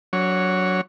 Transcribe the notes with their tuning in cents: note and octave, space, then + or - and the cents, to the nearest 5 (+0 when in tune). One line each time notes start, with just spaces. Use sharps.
F#3 +0 D4 -30 C#5 +0